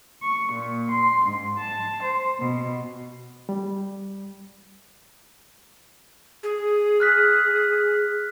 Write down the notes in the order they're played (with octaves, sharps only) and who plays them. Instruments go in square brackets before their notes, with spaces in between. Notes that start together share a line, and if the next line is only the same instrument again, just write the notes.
[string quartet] C#6
A#2
C6
G#2
A5
C5
B2
[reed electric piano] G3
[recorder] G#4
[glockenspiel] F6 F#6 B6